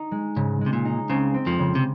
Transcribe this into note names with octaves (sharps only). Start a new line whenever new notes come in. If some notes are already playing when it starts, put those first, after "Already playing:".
Already playing: D#4
G#3
G#2 C#3
G#3
C3
A#2
D#4
C#2 C#3 C4
C4
F2 F3
C#3
C3